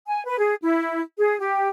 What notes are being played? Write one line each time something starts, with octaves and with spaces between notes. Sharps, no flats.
G#5
B4
G#4
E4
G#4
G4